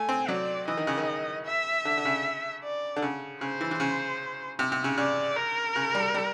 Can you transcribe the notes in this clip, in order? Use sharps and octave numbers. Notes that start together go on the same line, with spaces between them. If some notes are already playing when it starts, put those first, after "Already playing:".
Already playing: A3 G#5
C4
F#3 D5
E3 D#5
D#3
C#3
D#3
E5
D3
D3
C#3
D5
D3
C#3
C#3 C5
E3
E3
C#3
C3
C3
C#3
C#3 D5
A#4
C#3
G3
G3